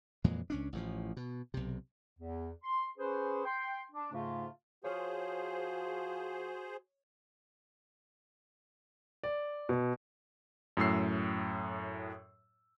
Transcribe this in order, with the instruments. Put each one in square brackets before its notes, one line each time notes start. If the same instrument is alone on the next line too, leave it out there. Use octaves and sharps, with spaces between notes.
[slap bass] F2 A#2 E3 G#3
C#2 C#4 D4
A1 A2 D#3 F3
B2
B1 C3
[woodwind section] E2
C6
C#4 G#4 B4 C5
G5 C6
D4
G#2 C#3 A3 F4
[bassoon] F3 [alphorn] F#4 [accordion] G#4 C5 [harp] C#5 D#6 F6
[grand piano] D5
B2
[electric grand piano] F#2 A2 E6 C7